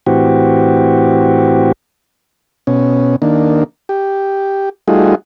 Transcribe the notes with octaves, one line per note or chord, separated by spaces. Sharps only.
A2 E3 C4 F#4 G4
B2 C#4
D#3 A#3 D4
G4
G3 A3 D#4 F4 F#4 G#4